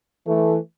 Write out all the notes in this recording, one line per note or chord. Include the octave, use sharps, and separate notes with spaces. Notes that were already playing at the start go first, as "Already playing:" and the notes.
E3 A3